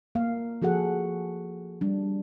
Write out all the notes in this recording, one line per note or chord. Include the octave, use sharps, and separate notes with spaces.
A#3 F5
F3 F#4 G#4 A4 F#5
G3 D4